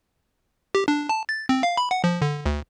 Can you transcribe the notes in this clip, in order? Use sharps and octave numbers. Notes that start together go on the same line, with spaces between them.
G4
D4
A5
A6
C4
F5
B5
F#5
F3
D3
D2